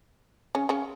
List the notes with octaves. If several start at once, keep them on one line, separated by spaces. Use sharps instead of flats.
C#3 C#4
C#3 C#4